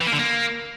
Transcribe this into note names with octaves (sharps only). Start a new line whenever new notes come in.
E3
A#3
D3
A#3